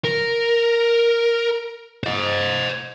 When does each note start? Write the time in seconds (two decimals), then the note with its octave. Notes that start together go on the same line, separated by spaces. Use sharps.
0.04 A#4
2.04 C5 D#5